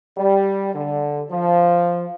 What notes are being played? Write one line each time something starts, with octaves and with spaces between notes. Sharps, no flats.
G3
D3
F3